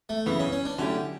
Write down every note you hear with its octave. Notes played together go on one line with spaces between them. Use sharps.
A3
F#2 C#3 E3 B3
C#4
C#4
D4
D3 F#3 A3 C#4 E4 G4